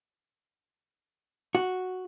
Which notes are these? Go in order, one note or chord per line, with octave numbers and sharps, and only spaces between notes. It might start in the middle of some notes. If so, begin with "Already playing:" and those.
F#4